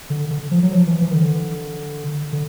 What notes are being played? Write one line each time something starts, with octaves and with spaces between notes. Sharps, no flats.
D3
D3
F3
F#3
F3
E3
E3
D#3
D3
D3